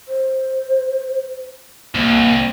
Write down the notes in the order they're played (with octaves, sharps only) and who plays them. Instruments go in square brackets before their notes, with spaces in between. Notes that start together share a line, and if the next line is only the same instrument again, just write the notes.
[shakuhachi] C5
[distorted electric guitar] C2 [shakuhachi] A#3